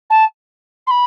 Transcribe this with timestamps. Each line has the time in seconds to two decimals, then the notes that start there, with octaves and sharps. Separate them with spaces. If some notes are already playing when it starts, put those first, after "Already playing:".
0.10 A5
0.87 C6
0.90 B5